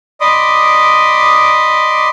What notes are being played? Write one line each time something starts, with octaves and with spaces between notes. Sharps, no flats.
D5 D#5 B5 C6 D6 D#6